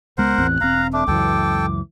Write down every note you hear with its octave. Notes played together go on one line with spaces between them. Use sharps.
C#2 G#3 B3 A#4 C5 F#5
A1 E2 C4 F#6
E1 C4 F5 A#5
A3 D4 D6
C#2 F#2 E3 A4 G5